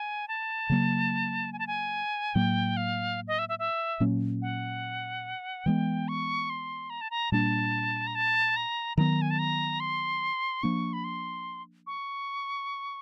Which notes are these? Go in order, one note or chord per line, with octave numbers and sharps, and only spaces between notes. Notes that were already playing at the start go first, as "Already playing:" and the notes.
Already playing: G#5
A5
C#3 F#3 A#3
G#5
A5
G#5
A2 F#3 A#3 G5
F5
D#5
E5
E5
E5
A#2 F#3 A#3 C#4
F#5
E3 G#3 B3 G5
C#6
C6
A#5
A5
A#5
A#2 G3 A#3 D4 A5
A#5
A5
A#5
D#3 F#3 B3 A#5
G#5
A5
A#5
C6
F3 A#3 D4 C#6
B5
C6
C#6